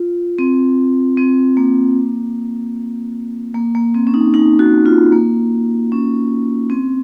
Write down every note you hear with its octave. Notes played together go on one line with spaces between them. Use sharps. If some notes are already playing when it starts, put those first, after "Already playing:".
Already playing: F4
C4
C4
A#3
A#3
A#3
C4
C#4
D#4
D#4
F#4
F4
A#3
C#4
C4